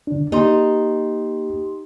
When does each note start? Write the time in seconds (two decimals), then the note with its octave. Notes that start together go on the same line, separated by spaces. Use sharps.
0.07 D3 D4
0.32 A#3 D#4 G4 C6